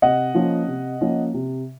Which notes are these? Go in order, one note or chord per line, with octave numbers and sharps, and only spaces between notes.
C3 D#5 F#5
F3 A#3 C#4
C3
F3 A#3 C#4
C3